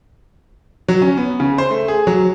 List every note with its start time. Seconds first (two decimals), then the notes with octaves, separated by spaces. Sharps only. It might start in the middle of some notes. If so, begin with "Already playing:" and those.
0.88 F#3
1.02 C#4
1.17 B3
1.40 C#3
1.58 C5
1.71 A3
1.88 G#4
2.07 F#3